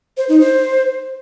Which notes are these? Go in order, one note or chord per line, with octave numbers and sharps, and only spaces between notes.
C5
D#4
C5